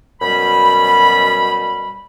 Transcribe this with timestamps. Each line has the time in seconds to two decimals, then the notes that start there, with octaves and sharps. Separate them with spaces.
0.22 F#2 B2 G3 B5